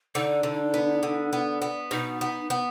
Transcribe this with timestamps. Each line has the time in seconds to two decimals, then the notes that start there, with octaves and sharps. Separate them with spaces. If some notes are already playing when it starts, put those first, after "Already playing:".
0.15 D3 D#4
0.43 D3
0.74 B3
1.03 D3
1.33 B3
1.62 B3
1.91 B2 D#4
2.21 B3
2.50 B3